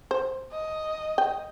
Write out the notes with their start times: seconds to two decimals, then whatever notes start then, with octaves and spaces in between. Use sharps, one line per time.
0.11 C5
0.52 D#5
1.18 G5